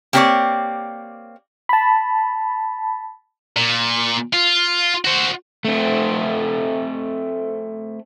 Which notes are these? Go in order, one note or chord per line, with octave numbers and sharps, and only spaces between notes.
A#3 C4 G4 B4 C#5 D5
A5 B5
A#2
F4
F#4 C5
A3 C4